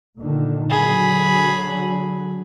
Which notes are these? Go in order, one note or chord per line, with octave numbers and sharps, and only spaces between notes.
A#2 D3 D#3
D3 F#3 G#4 B5